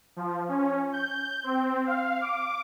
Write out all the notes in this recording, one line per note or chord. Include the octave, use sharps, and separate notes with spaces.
F3
C#4
G6
C4
F5
D6